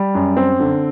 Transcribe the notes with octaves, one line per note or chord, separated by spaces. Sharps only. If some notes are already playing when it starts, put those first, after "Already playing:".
Already playing: G3
F#2
C4
D3